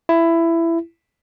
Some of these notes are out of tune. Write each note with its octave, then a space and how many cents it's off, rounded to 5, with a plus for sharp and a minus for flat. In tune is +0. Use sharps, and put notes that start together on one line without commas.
E4 +15